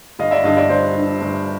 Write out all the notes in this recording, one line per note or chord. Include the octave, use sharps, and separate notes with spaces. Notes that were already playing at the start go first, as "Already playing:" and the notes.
G1 D#5 F5
D5 E5
G2 D3 D#5 F5
D5 E5
G1 C5 D5
G2 D3
G1